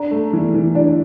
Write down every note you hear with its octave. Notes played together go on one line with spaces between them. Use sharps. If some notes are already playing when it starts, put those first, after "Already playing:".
Already playing: D4 A#5
A3
E3
E3
D4